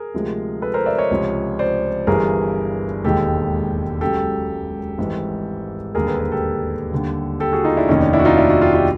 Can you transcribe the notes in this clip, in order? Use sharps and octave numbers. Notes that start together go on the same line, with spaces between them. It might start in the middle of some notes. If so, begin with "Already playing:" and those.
Already playing: G#4 A#4
D2 C3 F3 G#3
A4 B4
A#4 C5
D5 E5
C#5 D#5
C#2 C3 F3
C5 D5
G1 G2 E3 G3 G#4 A#4
E1 D#2 D#3 G#3 G4 A4
C#2 C#3 F#3 G4 A4
G#1 G#2 E3 G3
E1 D#2 D3 G3 G#4 A#4
A4 B4
G#4 A#4
G4 A4
D#2 D3 G3
G4 A4
F#4 G#4
D#4 F4
D4 E4
F1 D#2 D#3 C#4 D#4
D4
D4 E4
F#4
D#4 F4
D4 E4
E4 F#4
F4 G4
F4 G4